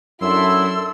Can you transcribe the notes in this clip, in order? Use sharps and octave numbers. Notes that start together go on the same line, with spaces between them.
F#2 D4 E4 A4 C6 E6